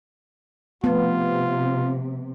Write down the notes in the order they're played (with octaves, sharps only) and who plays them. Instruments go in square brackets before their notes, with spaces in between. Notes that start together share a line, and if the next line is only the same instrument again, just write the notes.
[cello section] C3 [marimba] F3 A3 [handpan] B3 [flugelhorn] F4